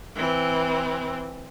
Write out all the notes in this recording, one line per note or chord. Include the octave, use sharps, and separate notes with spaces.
E3 C4